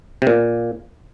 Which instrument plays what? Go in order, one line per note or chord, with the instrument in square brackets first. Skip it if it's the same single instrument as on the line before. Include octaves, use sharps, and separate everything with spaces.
[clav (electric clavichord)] C3
A#2